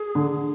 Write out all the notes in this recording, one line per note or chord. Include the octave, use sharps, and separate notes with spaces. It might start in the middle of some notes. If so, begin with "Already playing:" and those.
Already playing: G#4
D3